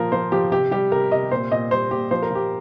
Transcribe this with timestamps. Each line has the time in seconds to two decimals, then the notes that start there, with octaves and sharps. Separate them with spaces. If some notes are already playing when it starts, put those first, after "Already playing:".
Already playing: A#2 F3 F4 A#4
0.12 F3 C5
0.32 F3 G4
0.52 C3 G4
0.71 G3 G4
0.92 C3 A#4
1.11 C3 D#5
1.31 A#2 C5
1.51 A#2 D#5
1.71 G3 C5
1.91 A#2 G4
2.11 F3 C5
2.22 A#4
2.30 F3 G4